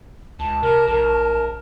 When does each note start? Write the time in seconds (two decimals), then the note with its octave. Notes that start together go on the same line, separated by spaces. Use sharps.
0.39 C#2 A5
0.63 C3 A#4
0.88 A#1 A#4